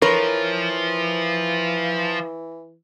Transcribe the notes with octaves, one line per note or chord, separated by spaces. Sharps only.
E3 F3 A#4 B4 C#5